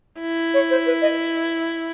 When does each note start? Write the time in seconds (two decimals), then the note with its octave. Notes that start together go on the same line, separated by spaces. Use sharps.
0.21 E4
0.54 C#5
0.70 C5
0.86 B4
1.02 D#5